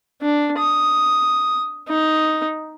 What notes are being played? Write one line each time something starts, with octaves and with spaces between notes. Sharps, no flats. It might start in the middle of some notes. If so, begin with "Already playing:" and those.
D4
D#6
D#4